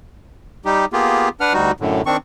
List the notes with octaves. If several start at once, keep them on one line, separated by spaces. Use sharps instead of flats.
G3 D#4 G4
A#3 B3 F4 G4 G#4
D4 B4 F#5 F6
D2 G3 D#4 F#4
F#2 A2 D3
D#3 C4 D4 C#6